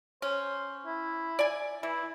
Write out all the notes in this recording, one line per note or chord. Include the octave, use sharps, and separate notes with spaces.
C#4 C5
E4
D5 G#5
E3 E4